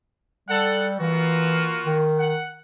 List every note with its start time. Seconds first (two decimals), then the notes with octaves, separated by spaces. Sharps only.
0.49 G3 A4 F#5
1.00 E3 A#3 F4 F#4
1.85 D#3
2.19 F#5